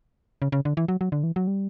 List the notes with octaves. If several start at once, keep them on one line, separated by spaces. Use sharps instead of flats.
C#3
C#3
D3
E3
F#3
F#3
D3
E3
F#3
G3